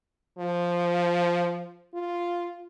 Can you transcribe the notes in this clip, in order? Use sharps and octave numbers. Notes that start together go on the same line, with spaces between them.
F3
F4